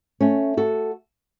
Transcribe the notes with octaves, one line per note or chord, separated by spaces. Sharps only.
A3 C#4
F#4 A4